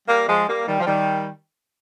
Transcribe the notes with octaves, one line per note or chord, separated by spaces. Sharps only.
G3 A#3
F3 G#3
G3 A#3
D#3 G3
F3
D#3 G3